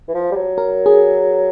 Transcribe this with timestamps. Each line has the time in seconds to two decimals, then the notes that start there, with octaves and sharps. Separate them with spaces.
0.08 E3
0.15 F3
0.31 G3
0.36 F#3
0.58 A#4
0.86 G#4